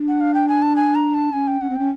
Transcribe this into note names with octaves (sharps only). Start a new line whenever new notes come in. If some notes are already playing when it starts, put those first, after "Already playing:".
Already playing: D4
F#5
F5
G5
G#5
A5
G#5
A#5
A5
C#4 G#5
G5
C#4 F#5
C4
C#4 G5